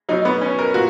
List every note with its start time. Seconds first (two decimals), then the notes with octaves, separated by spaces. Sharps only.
0.09 B2 F#3 D#4
0.25 B3
0.41 C#4
0.59 A#4
0.74 A#2 F#4